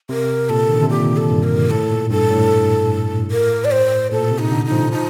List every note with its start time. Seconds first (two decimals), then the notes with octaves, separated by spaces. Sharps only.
0.09 C3 A#4
0.49 A#2 A4
0.68 D#3
0.76 D3
0.83 C3
0.90 A#2 G4
1.17 A4
1.30 G2
1.43 A#4
1.70 A2 A4
1.91 A#2
2.10 G2 A4
2.31 A2
3.31 A#4
3.65 D5
3.71 C5
4.11 A#2 A4
4.31 C3
4.39 D#4
4.51 D3
4.65 D#4
4.71 F3
4.92 F3 D#4